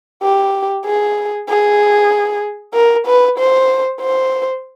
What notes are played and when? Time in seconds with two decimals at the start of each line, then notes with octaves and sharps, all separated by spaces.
0.23 G4
0.86 G#4
1.49 G#4
2.74 A#4
3.07 B4
3.38 C5
4.01 C5